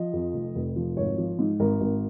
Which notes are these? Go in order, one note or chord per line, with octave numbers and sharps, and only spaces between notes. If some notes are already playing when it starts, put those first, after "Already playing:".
Already playing: F3 D#5
F2
F1
F1
F3
G#1 C#5
F3
G#2
G#1 A#4
G#1